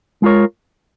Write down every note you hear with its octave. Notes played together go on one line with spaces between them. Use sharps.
G#3 F4 A#4 C#5